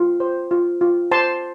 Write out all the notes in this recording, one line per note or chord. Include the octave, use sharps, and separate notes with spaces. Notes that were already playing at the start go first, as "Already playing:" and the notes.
Already playing: F4
C5
F4
F4
C5 A5 C6